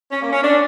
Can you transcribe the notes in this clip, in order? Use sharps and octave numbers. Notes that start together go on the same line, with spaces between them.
C#4
A#3
C#4
D4